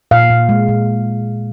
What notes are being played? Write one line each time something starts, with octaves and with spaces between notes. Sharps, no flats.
A#2 F5
A#2
G#3
A#2